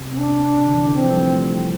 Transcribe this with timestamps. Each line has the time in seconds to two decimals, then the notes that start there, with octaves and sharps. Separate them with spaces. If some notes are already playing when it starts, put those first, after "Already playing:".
Already playing: C3
0.11 C4
0.18 D4
0.56 C3
0.66 D3
0.75 E3
0.84 D3
0.93 E3 C4
1.04 F3
1.12 G3
1.22 A3